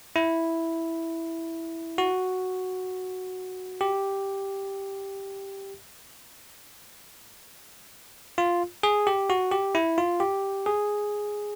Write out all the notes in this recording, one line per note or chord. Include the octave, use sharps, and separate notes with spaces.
E4
F#4
G4
F4
G#4
G4
F#4
G4
E4
F4
G4
G#4